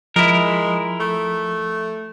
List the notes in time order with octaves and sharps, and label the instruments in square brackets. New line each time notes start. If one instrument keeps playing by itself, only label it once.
[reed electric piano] F3 [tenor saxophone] G#3 [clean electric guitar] E4 A#4
[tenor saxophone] A3